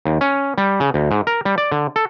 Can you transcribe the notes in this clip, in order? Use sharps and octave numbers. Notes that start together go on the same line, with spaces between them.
D#2
C#4
G3
C#3
D2
G#2
A#4
G3
D5
D3
A4